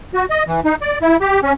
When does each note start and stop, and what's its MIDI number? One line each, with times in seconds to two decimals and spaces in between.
0.14 0.25 66
0.30 0.44 75
0.47 0.60 52
0.65 0.75 63
0.81 0.98 74
1.02 1.17 64
1.21 1.40 67
1.43 1.53 61